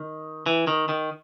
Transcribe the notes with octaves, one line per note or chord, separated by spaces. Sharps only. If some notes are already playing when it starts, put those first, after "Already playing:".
Already playing: D#3
E3
D#3
D#3